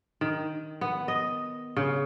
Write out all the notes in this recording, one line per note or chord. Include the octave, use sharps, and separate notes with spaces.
D#3
B3
D#5
C#3